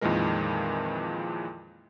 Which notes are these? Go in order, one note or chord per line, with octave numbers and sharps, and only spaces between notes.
F2 A#2 D#3 E3 G#3 A#4